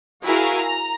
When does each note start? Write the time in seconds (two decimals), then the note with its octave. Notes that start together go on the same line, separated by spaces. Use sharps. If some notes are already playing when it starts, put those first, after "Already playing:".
0.24 E4 F#4 G#4 A#4 F5 A#5
0.56 A#5